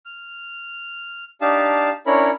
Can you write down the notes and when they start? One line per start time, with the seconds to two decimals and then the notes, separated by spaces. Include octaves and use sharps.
0.05 F6
1.41 D4 D#4 G4 F5 A5
2.06 C#4 D4 E4 A#4 C#5 B5